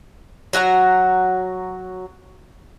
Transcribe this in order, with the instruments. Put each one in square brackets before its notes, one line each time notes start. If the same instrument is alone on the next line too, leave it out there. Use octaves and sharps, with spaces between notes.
[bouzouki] F#3 F#4 D#5 A#5